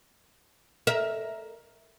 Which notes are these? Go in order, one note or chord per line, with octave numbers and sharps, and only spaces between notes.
A#4 E5